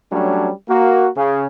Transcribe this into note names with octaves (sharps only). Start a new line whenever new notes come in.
F#3 G3 A3 C#4 D4
A#3 F#4
C#3